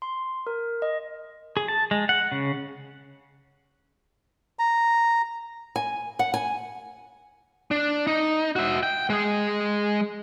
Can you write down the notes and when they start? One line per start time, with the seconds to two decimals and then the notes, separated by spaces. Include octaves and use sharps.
0.02 C6
0.47 A#4
0.82 D#5
1.57 G#4
1.68 A5
1.91 G#3
2.09 F#5
2.32 C#3
4.59 A#5
5.76 G#5
6.19 F#5
6.34 G#5
7.71 D4
8.07 D#4
8.56 F#4 E5
8.83 G5
9.10 G#3 G#4